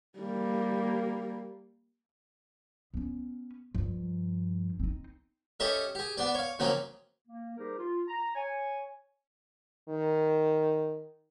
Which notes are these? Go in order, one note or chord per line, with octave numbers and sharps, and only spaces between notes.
G3 A#3
B3 C#4
G2 F3
C4 D#4
C#4 G4 A4 D#5 E5
G4 G#4
B3 D4 D5
C#5 F5
C#3 F3 F#3 A#3 C4
A#3
G3 D#4 G4 G#4 A#4 C5
F4
A#5
C#5 G#5
D#3